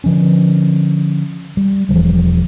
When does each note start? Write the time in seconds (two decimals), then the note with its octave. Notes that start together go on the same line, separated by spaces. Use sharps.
0.04 D3 F3 C#4
1.57 G3
1.89 E1 E3 F3 G3